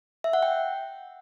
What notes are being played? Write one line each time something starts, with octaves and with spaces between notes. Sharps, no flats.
E5
F#5
G5